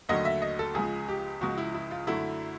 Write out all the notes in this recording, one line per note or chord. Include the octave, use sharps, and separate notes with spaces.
D#2 D3 F#3 A3 D#5
E5
D#5
A4
C#2 C#3 F3 G#3 G#4
G4
C#2 C#3 F3 G#3 F#4
E4
E4
F4
F#2 D3 F#3 A3 E4